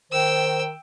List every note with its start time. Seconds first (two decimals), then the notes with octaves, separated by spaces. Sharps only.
0.12 D#3 C5 G5 E6